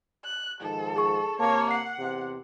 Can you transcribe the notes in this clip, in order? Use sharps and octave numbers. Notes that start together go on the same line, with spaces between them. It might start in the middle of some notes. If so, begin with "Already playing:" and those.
F#6
G#2 D#3 F3 A4
G#4 C#6
C3 A#3 C#5 A5
F#5 C7
E2 C3